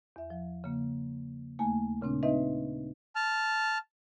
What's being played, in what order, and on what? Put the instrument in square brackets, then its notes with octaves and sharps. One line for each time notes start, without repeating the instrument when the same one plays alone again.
[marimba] E2 E5
F3
C#3 A#3
D#2 A3 A#3 G#5
A#2 C#3 C4 D4
C4 D#4 B4 D#5 E5
[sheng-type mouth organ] A5 F6